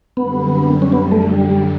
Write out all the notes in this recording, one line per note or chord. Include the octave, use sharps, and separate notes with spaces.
F#2 D3 G3 B3
C#4
B3
A3
G3
G3